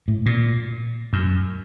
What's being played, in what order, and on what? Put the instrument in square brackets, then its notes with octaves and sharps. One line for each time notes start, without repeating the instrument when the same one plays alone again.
[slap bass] A2
A#2
F#2